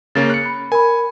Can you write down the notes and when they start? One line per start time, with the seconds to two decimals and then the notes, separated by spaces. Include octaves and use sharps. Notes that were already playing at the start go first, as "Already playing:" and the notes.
0.15 C#3 A#3 C#4 A6
0.30 F#6 C#7
0.45 B5
0.72 A#4 G#5 B5